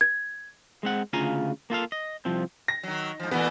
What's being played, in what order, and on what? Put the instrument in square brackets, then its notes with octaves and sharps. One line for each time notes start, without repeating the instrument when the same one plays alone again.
[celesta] G#6
[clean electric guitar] G#3 C4 F#5
D2 C#3 F4 F5 G#5 A#5
A#3 F4 A4 F5
D#5
C2 F3 C4
[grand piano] A#6
[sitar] D#3 F#3
G#2 F3
[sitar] A#2 E3 A3 [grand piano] B3